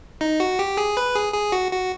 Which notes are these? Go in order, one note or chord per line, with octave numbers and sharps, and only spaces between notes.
D#4
F#4
G4
G#4
B4
G#4
G#4
F#4
F#4